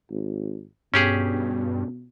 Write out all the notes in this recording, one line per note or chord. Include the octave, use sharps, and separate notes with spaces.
G#1
G2 B2 C#4 G4 G#4